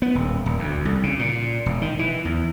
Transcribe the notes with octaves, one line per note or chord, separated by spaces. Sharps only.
B3
D#1
D#1
D2
C2
C#3
A#2
E1
D#3
E3
E2